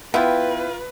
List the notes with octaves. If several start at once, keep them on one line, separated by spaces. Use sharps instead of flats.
B3 E4 F4 B4 G5